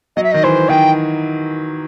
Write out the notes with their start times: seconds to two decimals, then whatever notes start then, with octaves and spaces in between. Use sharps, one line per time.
0.16 F#3 D#5
0.24 E5
0.32 D#3 D#5
0.43 E3 C5
0.69 D#3 G5